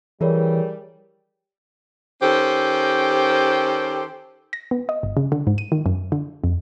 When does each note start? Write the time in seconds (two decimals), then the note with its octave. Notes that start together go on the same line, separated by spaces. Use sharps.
0.21 E3 G3 G#4 A#4 C#5
2.22 D#3 C#4 G4 A4 C5
4.53 A#6
4.71 B3
4.89 D#5
5.03 G1
5.17 C#3
5.32 D3
5.47 G#2
5.58 D#7
5.72 D#3
5.86 F#2
6.12 D3
6.44 F2